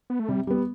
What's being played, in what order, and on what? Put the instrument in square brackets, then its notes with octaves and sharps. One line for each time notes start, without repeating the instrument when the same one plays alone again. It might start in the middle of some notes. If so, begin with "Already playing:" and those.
[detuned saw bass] B3
A3
[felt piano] C3 [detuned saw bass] G3
[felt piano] G3 B3